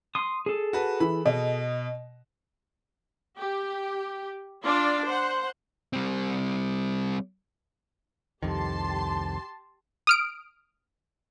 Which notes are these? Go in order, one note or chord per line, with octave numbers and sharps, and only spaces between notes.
C6 D#6
G#4 A4
F#4 B4 A5
E3 B5
B2 D#5
G4
D4 F4 D5
C5 F#5
G3 C4
C2 F2 D#3 G4 A5 C6
D#6 F6 D7